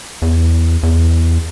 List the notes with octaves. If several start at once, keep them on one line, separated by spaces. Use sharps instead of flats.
E2
E2